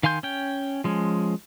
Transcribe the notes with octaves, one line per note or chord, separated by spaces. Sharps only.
D#3 F5 G#5 C6 G6
C#4 G5
F3 G#3 C#4